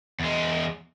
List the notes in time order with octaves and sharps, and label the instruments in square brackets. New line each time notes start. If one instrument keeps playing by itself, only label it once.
[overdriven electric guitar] E2 G#3